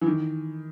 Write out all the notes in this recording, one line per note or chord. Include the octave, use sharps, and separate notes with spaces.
E3
D#3